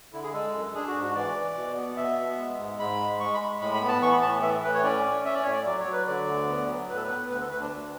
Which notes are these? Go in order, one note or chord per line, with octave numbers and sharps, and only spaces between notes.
D3 E4
G#4
G#3 A4
F#2
D4 G#4
F#4
G#2
F#4
E3 D5
E3
B2
B3
B2 E5
B3
G#3
G#2
G#2 B5
G#3
G#3 C#6
B5
G#3
A2 B5
B5
B3
A5
E3 C#6
B5
A2 A5
E3 E5
A2 B4
C#5
C#4 D5
C#4
C#4 E5
D5
A2 C#5
D5
F#3 D5
C#5
F#3
B4
D3 D5
D2
B3
F#3
A2 B4
A4
B4
B3
D2 B4
A4
D2 B4
D4
D2